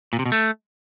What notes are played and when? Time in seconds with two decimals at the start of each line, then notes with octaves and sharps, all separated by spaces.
0.13 A#2
0.19 C3
0.26 B2
0.32 A3